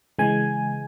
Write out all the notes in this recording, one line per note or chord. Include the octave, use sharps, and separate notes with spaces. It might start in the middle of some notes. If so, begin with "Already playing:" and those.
C#3 E3 G#3 G#5